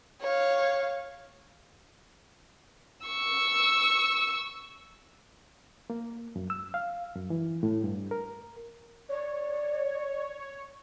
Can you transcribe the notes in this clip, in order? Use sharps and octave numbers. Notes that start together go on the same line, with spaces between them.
C#5 F5
C#6 E6
A#3
F#2
E6
F5
F#2
E3
A2
G2
A#4
C#5 D5